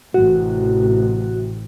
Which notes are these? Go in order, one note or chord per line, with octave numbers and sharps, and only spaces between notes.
A1 C3 F#4